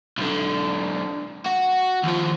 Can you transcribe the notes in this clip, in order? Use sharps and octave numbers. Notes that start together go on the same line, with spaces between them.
B1 D3
F#4
D#2 F3